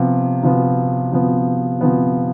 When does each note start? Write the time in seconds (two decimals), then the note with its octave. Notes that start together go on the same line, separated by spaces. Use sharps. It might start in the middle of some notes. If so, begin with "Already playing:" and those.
Already playing: C3 F3 B3
0.43 C3 F3 B3
1.12 C3 F3 B3
1.81 C3 F3 B3